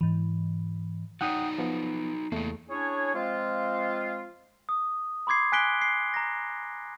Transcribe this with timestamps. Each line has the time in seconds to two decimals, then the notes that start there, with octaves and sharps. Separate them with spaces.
0.01 G#2 E3
1.21 F#3 D#4 D5 F#5 G5 D#6
1.58 F3 B3
2.32 E2 A3 A#3 E4
2.69 C#4 D4 E4 G#4 C#5
3.14 F3 G#3 C4 F4
4.69 D#6
5.27 B5 C6 D6 G#6 C7
5.52 G#5 F#6 B6 D7 G7
5.82 C7
6.14 A#5 A#6